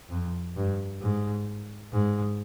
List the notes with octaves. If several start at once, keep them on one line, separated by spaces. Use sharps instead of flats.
F2
G2
G#2
G#2